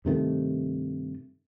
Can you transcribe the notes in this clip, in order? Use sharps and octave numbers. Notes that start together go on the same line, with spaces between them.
G2 C3 D#3 A3